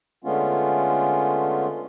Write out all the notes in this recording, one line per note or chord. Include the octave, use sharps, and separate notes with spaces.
D3 G#3 A3 B3 C#4 F4